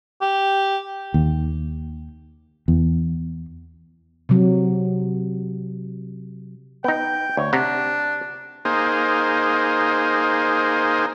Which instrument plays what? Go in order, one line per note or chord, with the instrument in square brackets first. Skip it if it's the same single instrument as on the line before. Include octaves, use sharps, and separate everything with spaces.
[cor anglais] G4
[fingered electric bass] D#2
E2
[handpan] C3 F#3
[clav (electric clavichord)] B3 D#4 [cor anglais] G5
[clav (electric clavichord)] D2 [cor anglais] C#5
[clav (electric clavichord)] C3 F#5 A#5 [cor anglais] D4
[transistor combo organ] A#3 D#4 G#4 C5